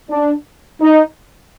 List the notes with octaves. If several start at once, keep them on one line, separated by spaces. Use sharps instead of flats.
D4
D#4